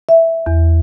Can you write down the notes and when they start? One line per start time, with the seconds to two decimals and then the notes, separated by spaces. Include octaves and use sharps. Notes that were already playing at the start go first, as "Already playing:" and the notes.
0.09 E5
0.46 E2